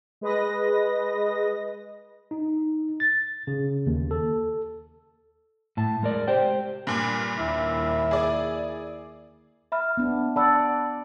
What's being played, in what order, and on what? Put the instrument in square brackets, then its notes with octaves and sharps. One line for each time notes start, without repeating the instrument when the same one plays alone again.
[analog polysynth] G#3 B4 D#5 A#6
[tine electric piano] D#4
A6
C#3
D#2
A4
[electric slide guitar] A2 A5
G#3 A#4 D5
G4 C5 G5
[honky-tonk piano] G2 A#2
[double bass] D#2 E4
[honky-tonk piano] G#4 D5
[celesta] E5 B5 F6
[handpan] B3 D4
[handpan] D5 F#5 [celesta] A5 B5 E6